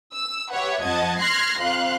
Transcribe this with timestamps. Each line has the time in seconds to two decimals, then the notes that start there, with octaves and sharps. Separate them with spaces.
0.14 E6
0.51 G4 B4 C#5 E5 F#5
0.84 F2 F3 D#5 F#5 A5 G#6
1.21 C6 F6 F#6 G#6 A#6 C7
1.59 F2 F5 C6 F#6